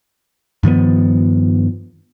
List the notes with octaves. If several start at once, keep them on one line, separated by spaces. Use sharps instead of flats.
G2 D#3 F3 B3